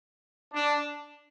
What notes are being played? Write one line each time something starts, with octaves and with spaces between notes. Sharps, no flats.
D4